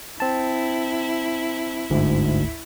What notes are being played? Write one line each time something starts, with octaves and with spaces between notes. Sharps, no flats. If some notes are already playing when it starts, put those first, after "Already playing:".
C4 E4 A5
G1 D2 G#2